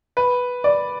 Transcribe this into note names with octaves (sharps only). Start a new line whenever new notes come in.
B4
D5